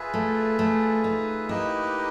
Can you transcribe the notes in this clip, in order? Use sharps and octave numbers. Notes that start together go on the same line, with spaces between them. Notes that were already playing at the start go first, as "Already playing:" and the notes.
Already playing: F4 G#4 B4 E5 G#5
A3
A3
D#4
A#3 D#4 E4 G4 B4 D#5